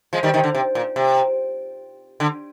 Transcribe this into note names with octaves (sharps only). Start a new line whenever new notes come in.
F3 G#3
D#3 G3
C3 D#3
D3
C3
A#2
C3
D3